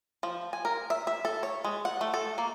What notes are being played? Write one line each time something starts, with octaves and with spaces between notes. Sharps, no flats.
F3
G#5
A#4
E5
E5
A4
C#5
G#3
F#5
A3
A4
A#3